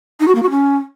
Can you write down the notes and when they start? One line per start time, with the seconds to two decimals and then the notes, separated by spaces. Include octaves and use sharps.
0.20 D#4
0.27 F#4
0.35 A#3
0.43 F#4
0.50 C#4